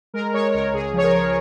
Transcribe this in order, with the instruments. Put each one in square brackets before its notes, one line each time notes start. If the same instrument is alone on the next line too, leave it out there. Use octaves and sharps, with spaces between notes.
[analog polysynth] G#3 A#4
G#3 C#5
C#2 A#4
C#2 G#4
F3 C#5
A#4
F3